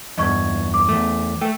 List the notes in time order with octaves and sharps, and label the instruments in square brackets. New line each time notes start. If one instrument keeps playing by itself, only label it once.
[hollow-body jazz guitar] E2 G2 [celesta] D#5 C#6 G#6
[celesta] D6
[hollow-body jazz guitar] E2 G#2 A3
[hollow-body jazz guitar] A3 [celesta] G5